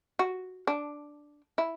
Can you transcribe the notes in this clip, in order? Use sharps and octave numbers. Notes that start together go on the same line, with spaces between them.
F#4
D4
E4